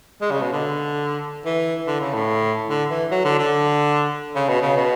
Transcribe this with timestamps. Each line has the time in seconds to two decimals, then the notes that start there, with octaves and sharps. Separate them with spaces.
0.21 G#3
0.31 C#3
0.41 B2
0.52 D3
1.45 E3
1.87 D3
2.01 C#3
2.14 A2
2.69 D3
2.90 E3
3.11 F#3
3.25 D3
3.39 D3
4.35 C#3
4.48 B2
4.62 C#3
4.76 B2